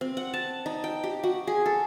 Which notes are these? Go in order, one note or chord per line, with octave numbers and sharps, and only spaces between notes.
C4
F#5
A5
D#4
G5
G4
F#4
G#4
A4